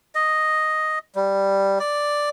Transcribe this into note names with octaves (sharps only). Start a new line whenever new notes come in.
D#5
G3
D5